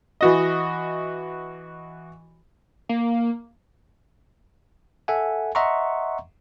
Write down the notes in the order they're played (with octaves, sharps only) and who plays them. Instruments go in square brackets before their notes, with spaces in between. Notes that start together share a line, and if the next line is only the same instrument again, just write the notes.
[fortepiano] E3 F#4 D#5
[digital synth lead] A#3
[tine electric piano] A4 E5 F#5 G#5
D#5 E5 F#5 A#5 C6 C#6